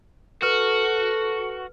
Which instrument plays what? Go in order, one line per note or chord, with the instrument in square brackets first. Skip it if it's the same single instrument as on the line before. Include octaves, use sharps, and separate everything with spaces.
[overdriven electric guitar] F#4 [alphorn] A4 [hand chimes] B4 F6